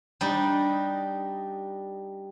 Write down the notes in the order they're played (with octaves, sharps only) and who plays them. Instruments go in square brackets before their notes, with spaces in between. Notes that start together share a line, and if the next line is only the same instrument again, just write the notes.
[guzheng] G3 D4 D#4